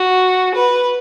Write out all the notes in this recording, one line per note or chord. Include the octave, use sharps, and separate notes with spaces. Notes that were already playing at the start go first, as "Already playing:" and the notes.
Already playing: F#4
B4